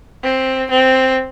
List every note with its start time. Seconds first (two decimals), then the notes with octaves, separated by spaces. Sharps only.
0.24 C4
0.70 C4